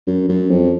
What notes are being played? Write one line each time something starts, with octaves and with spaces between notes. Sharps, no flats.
F#2
F#2
F2